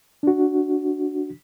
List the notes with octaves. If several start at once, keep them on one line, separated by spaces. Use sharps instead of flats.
D4 F#4